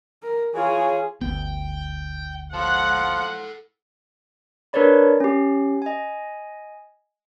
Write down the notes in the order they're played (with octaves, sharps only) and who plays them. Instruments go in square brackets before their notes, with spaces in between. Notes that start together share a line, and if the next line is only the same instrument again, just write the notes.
[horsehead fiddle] A#4
[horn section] E3 F4 C#5 [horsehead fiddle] G#4
[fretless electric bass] G1 D2 B3 [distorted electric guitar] G5
[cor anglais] F3 [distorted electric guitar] A4 C#5 [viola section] F#5
[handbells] D4 A#4 B4 C#5 D5 B5
C#4 G4
D#5 G#5